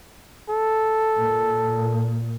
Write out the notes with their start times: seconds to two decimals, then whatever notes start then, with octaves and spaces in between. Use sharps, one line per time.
0.50 A4
1.21 A#2